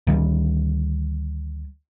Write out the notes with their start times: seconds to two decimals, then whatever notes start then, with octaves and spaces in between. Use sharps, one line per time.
0.07 D2 D#3 G3